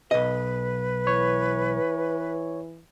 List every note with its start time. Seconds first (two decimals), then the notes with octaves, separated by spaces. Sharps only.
0.11 B1 B4 D#5
1.07 E3 C#5